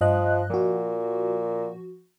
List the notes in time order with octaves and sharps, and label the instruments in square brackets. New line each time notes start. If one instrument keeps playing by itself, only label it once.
[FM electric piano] G2 D#5 F#6 [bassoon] F3
[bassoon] A#2 [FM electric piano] F3 F#4